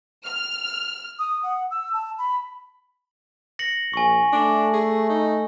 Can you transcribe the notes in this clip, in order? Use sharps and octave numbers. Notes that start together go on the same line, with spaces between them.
F6
D#6
F#5
E6
A5
B5
A#6 C#7 F#7
A#1 G#5 C#6
A3 D4
G#4
D#4